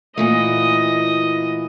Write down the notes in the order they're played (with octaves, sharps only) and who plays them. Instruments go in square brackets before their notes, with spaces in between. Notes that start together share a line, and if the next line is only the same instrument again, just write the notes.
[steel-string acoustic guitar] A#2 E3 A3 [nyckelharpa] D#5